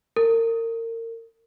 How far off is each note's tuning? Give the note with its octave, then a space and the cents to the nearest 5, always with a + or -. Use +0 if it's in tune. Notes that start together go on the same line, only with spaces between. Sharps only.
A#4 -30